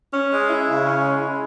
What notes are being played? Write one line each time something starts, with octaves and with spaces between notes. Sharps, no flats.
C#4
G#3
E4
C#3
C#4
G#3
E4